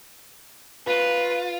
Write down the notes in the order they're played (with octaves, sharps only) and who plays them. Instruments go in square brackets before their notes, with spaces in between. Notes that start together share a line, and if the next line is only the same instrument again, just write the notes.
[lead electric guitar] F4 [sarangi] B4